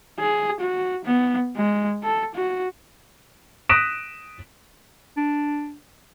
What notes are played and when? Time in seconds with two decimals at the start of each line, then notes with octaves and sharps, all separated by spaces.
0.19 G#4
0.60 F#4
1.05 B3
1.56 G#3
2.04 A4
2.35 F#4
3.69 D#6 F#6 A#6 B6 D7 E7
5.17 D4